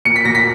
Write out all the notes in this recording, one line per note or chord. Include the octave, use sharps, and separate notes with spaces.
A#2 C#7
B6
A#2 A#6
B6